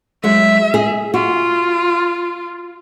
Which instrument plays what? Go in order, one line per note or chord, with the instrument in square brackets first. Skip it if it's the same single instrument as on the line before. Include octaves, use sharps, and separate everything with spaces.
[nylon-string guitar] F#3 G#3 [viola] E5
[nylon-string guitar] G#4
[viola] F4 [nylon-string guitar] F#4